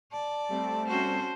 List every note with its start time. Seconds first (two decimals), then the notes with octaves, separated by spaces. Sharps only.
0.12 D5 A5
0.49 G3 A3 C4
0.87 C#4 F#4 C5